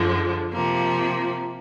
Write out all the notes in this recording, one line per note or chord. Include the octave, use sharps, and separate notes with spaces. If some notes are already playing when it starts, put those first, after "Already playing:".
Already playing: F#2 D3 F3 G#3
C3 F3 A#3